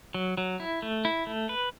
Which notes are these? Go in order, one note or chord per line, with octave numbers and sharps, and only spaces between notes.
F#3
F#3
E4
A3
E4
A3
B4